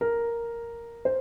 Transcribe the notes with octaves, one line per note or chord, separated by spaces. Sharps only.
A#4
C5